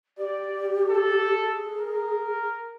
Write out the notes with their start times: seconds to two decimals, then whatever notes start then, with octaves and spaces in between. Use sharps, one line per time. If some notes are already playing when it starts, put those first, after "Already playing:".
0.18 G4 D5
0.88 A4
1.41 G#4
1.79 A#4